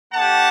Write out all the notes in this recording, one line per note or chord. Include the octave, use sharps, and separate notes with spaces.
A3 D4 G4 F#5 A5